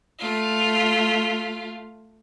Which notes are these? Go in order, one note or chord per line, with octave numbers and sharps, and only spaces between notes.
A3 F4